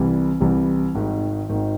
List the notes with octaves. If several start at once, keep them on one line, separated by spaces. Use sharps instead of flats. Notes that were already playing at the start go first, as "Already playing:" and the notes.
Already playing: C2 C3 E3 G3
C2 C3 E3 G3
G#1 G#2 D#3
G#1 G#2 D#3